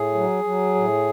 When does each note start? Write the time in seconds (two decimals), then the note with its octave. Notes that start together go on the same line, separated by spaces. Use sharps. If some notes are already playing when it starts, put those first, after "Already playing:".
Already playing: A2 G#4
0.14 F#3
0.44 F#3
0.75 A2